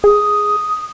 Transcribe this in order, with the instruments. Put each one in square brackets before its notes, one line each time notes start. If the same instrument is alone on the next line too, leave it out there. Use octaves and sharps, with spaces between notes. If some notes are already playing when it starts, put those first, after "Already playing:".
[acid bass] G#4 [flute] D#6